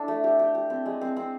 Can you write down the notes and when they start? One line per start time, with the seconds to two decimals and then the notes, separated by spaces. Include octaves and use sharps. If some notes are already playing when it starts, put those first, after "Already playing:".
Already playing: D4 E4 A4
0.08 A3
0.24 G4
0.39 G4
0.55 G4
0.70 C4
0.86 G#3
1.01 C4
1.17 C4